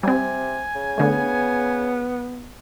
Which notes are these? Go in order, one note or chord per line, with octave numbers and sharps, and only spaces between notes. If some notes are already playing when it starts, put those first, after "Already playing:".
C3 G3 C4 G#5
C#3
D3 A3 B3